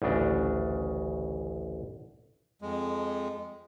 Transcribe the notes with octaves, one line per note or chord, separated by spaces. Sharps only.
A1 D2 C#3 D4
F2 G#3